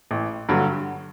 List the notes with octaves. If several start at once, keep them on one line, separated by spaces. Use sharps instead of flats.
A1
G2 D3 F#3